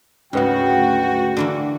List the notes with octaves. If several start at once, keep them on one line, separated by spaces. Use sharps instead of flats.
D2 G#2 C#3 C#4 F#4 B4 F#5 G5
D3 E3 A#3